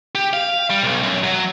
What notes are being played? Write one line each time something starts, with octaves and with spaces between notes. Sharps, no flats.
G4
F5
G3
B1
F#2
F#3